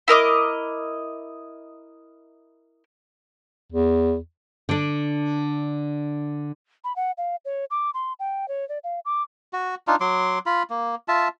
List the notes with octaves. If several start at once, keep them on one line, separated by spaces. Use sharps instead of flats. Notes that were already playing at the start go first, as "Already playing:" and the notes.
E4 A#4 D#5 D6
E2
D3 D4
B5
F#5
F5
C#5
D6
C6
G5
C#5
D5
F5
D6
F#4
D4 D#4 F4
F#3 C6 D6
F4 B5
A#3
F4 E5 A5